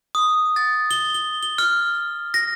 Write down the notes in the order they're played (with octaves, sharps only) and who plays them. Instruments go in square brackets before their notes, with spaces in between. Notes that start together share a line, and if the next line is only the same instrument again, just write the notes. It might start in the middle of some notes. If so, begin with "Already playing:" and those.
[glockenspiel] D#6
A6
G7
G7
G7
F6
A#6